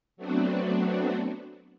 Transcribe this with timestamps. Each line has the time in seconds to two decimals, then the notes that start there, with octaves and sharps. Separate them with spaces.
0.17 F#3 A3 B3 C4 D4 F#4